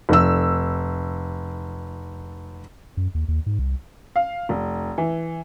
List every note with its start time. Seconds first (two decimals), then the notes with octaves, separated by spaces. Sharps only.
0.09 F1 E6
2.97 F#2
3.15 D#2
3.28 D#2
3.46 G#2
3.59 C2
4.16 F5
4.49 F1
4.98 E3